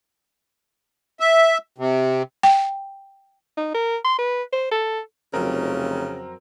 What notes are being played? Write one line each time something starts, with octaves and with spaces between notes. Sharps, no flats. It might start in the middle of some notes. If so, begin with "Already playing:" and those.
E5
C3
G5
D#4
A#4
C6
B4
C5
A4
F1 F2 C#3 F#3 C4 F4 A#4